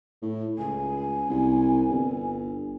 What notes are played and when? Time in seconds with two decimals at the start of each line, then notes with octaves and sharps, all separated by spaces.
0.22 A2
0.58 C#2 G#5
1.29 C2
1.89 G1